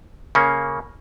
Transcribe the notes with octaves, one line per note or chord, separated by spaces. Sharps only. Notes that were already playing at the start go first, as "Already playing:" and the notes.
C#3 A#3 C#4